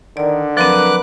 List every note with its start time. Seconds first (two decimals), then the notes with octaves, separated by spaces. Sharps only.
0.17 D3 D#3 D5
0.57 F3 F#3 C4 A#4 B4 D6 F#6